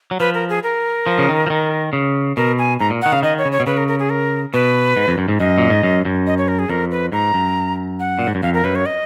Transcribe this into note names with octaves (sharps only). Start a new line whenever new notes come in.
F#3
F3 B4
A#4
G#4
A#4
F3
C#3
D#3
F3
D#3
C#3
B2 A#4
G#5
G#2 A#5
A#2
F#5
D#3
C#3 F5
D#3 D#5
C#5
C#3
C#5
B2
C#3 B4
A#4
A#4
G#4
A#4
B2 B4
G#2
F2
F#2
G#2
F#2 D#5
A#2
G#2
F#2
F#2
D#5
C#5
A#4
G#4
F2 A#4
B4
G#2 A#5
F#2
F#5
A#2
G#2
F#2
F2 F5
A#4
F#2 B4
C#5
D#5